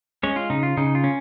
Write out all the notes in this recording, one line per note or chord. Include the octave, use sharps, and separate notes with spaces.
G#3 C#4 C#5
F4
C#3 D#4
F4
C#3 D#4
F4
C#4